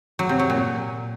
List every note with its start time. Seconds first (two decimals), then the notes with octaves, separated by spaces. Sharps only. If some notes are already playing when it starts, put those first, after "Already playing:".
0.19 F#3
0.29 C3
0.39 F#3
0.50 A#2